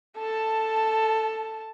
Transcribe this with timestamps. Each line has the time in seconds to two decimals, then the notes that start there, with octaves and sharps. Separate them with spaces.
0.18 A4 A5